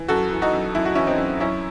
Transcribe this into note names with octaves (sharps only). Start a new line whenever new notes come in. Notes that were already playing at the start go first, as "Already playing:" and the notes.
Already playing: E3
F#2 F#4 A4
E3
D#4 F#4
F#2
F#2 E4
F#4
E3 C#4 E4
C4 D#4
F#2
F#2 C#4 E4